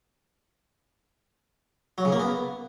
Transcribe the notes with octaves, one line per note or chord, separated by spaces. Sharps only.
F#3
C#3
A#3
B3